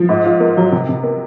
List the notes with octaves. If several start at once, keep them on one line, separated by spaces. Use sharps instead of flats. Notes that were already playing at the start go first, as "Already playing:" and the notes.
Already playing: F3
G#2
F4
A#3
F#3
C3
C3
A#3